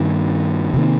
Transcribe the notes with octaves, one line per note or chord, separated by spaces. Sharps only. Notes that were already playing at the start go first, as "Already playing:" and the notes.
Already playing: G2 D#3 A#3
C3 D#3 A#3